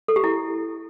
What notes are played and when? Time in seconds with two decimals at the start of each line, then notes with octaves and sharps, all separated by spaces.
0.08 A4
0.16 G4
0.24 E4